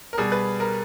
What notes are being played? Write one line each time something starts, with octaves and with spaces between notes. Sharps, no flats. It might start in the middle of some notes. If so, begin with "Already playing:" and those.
A#4
B2 G3 G#4
B4
A#4